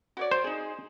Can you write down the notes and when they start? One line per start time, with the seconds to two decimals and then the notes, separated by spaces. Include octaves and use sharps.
0.17 F#4 C#5 D5
0.31 C5
0.44 D#4 G#4